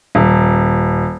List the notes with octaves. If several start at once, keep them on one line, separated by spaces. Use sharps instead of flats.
D#1